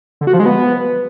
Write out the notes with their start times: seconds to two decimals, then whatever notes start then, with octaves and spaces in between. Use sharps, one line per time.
0.21 D3
0.27 F#4
0.33 F3
0.39 G#3
0.46 B3